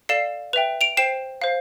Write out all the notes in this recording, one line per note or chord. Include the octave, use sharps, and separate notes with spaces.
A4 D5 F5 C7 E7
B4 E5 G5 F7
D7 F7
C5 G5 C7 E7
C5 F5